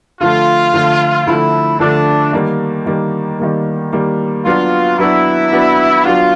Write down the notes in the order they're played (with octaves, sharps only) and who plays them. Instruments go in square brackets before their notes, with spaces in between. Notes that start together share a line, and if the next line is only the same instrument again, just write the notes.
[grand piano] D3 F3 A3 [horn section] F4
[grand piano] D3 F3 A3
[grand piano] D3 F3 A3 [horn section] E4
[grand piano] D3 F3 A3 [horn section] D4
[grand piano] D#3 G3 A#3
D#3 G3 A#3
D#3 G3 A#3
D#3 G3 A#3
[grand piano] F#3 B3 D4 F#4 [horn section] F4
[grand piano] F#3 B3 D4 F#4 [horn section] E4
[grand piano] F#3 B3 D4 F#4
[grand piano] F#3 B3 D4 F#4 [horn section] F4